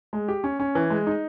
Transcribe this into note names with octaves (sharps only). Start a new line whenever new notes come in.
G#3
G4
C#4
C#4
E3
G#3
D#4